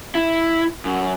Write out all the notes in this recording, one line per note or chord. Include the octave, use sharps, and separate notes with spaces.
E4
F#2